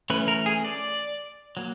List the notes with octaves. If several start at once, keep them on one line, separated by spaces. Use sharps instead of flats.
E3 A3 C#4 B4
A#4
G#4
D5
F#3 A#3